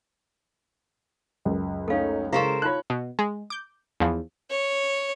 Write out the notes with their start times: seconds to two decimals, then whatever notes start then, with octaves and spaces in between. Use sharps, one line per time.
1.45 C#2 F#2
1.88 A3 C#4 D#4 A4 F5
2.33 C#3 G#3 E4 A4 A#4 C5 F5 C#6
2.62 D#4 F4 C#5 F#6
2.90 B2
3.19 G#3
3.50 D6 G6
4.00 E2 F3
4.51 C#5